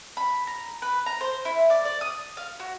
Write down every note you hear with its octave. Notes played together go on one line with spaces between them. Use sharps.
B5
A#5
B4
A#5
C5
E4
D5
D5
D#6
F5
F#4